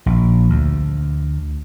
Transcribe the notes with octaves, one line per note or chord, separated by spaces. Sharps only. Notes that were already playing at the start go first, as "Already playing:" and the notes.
A#1
D2